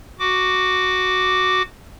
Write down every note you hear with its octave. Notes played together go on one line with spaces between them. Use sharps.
F#4 D6